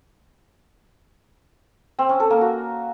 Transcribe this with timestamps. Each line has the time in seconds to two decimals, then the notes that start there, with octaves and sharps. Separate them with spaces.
1.99 C4
2.09 C#4
2.20 A4
2.30 A#3
2.41 F#4